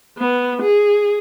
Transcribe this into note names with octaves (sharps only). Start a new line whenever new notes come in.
B3
G#4